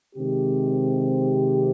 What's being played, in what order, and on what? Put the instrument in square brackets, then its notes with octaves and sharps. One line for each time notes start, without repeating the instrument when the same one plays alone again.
[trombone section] C3 D#3 G#3 C4 G4